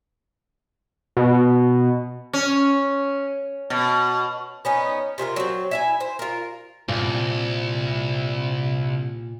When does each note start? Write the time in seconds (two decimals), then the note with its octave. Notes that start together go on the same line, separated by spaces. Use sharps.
1.17 B2
2.33 C#4
3.70 B2
4.65 B3 C#4 D#4
5.18 C3 F4 G#4 A#4
5.36 F#3 C4
5.71 E4 E5 G#5
6.00 C5
6.19 F4 A#4
6.88 C2 A#2